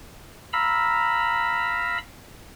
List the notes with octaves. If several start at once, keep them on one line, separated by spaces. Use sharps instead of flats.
F5 A#5 B5 E6